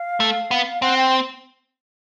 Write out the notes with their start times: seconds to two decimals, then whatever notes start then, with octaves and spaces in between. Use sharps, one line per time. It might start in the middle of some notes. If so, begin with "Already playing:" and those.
Already playing: F5
0.20 A3
0.51 B3
0.82 C4 F#5
0.98 G5